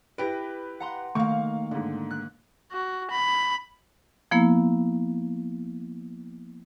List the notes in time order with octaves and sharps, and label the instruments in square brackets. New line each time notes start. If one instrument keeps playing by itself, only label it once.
[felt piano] E4 G4 B4 [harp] A#6 D7
[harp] F#5 A#5 C6
[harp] D#3 A#3 [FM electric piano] A3 [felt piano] F5 C#6
[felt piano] G#2 D3
[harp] F#6
[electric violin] F#4
B5
[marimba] F3 A#3 B3 E4